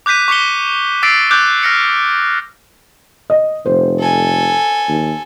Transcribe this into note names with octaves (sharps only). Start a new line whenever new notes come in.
D6 F#6 G6 B6 D#7
C#6 D6 B6 C#7 G7
D6 E6 A6 B6 C7 D7
D6 F#6 G6
F6 A#6 C#7
D#5
F1 C5
A4 G#5
D#2